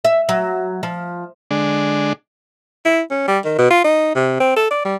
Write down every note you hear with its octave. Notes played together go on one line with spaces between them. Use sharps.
E5
F#3
F3
D3 G#3 D4
E4
C#4
G3
D#3
B2
F4
D#4
C3
C4
A4
D5
G3